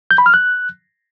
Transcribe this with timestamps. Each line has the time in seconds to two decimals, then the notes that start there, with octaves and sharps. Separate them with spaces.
0.11 G6
0.18 B5
0.26 F6
0.34 F#6